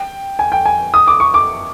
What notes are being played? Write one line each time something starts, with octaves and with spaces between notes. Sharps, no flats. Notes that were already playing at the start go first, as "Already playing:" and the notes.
Already playing: G5
G#5
G5
G#5
D#6
D6
C#6
D6